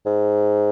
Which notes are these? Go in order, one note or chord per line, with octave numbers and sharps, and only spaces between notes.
G#2